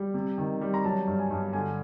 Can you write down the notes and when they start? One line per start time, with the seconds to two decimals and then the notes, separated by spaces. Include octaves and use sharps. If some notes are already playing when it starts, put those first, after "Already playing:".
Already playing: G3
0.14 C3
0.38 D#3
0.61 G3
0.74 A#5
0.85 F#3 A5
1.07 G2
1.19 G#5
1.31 G2
1.53 D3 G#5